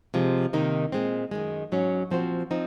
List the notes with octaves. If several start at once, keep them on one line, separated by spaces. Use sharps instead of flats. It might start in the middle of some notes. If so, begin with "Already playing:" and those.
C3 F3 G#3
C3 D#3 A#3 D#4
A#2 G#3 C4
F#2 D#3 G#3
G#2 F#3 C#4
A#2 F3 C4 F#4 C5
F3 C4 D#4